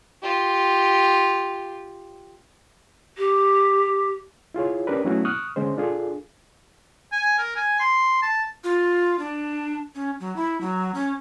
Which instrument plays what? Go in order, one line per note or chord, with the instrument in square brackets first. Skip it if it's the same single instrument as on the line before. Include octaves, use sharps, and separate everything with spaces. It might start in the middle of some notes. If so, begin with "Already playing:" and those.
[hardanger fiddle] F4 G4
[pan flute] G4
[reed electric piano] E4 F4 G#4 C#5
C#4 D4 G4 A#4 B4
F#3 A3 B3 C#4 E4 F#4
C#6 D#6 F6 F#6
D3 G#3 C#4 C5
D4 F4 G#4 A4
[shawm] G#5
A#4
G#5
C6
A5
[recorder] F4
D4
C#4
F#3
E4
F#3
C#4